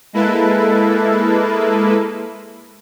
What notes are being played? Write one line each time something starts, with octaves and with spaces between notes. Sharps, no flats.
G#3 A#3 E4 A4 B4